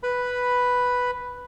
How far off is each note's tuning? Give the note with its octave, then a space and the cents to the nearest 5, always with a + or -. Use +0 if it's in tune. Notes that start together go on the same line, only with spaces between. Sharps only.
B4 +0 B5 +0